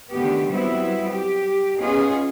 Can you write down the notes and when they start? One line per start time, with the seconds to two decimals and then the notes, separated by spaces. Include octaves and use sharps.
0.13 D3 D#3 A3 B3 G4
0.51 F#3 G3 B3 C4 E4
1.14 G4
1.80 B3 C#4 D#4 F4 G#4